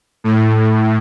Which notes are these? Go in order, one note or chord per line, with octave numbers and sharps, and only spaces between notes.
A2